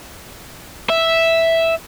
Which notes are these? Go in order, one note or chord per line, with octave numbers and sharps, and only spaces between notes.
E5